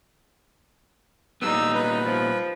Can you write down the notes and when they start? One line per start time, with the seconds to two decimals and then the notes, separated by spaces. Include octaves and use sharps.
1.42 A#2 G3 B3 D#4 E6
1.74 B4
2.06 F3